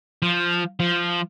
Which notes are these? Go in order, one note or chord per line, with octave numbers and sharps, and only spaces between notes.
F3
F3